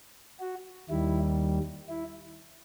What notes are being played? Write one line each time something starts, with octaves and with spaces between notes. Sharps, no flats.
F#4
D#2 D#3 G3 E4
E4